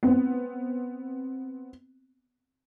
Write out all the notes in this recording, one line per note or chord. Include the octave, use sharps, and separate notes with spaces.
B3 C4